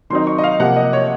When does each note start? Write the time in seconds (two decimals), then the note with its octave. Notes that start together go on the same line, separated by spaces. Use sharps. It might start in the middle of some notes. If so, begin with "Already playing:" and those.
0.10 D#3 F#3 C4 D#4 C6
0.27 C#6
0.38 D#5
0.44 F5
0.60 C3 F3 A#3 F#5
0.76 D#5
0.93 C#5